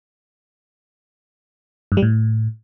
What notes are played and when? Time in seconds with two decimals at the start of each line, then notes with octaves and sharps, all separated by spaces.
1.92 G2
1.97 G3
2.02 A2